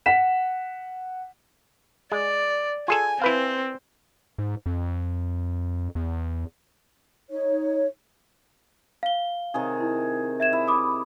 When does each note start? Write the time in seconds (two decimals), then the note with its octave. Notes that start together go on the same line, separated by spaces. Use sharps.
0.06 F#5 B6 E7
2.12 G#3 D5
2.88 F4 G#4 A4 G#5
3.22 C4 E4 B4 F5
4.38 G#2
4.66 F2
5.95 E2
7.30 D#4 C#5
9.03 F5 G7
9.54 C3 D#3 G#4
9.80 E4
10.40 E5 G#6 E7
10.53 E4
10.68 B5 D6 D#6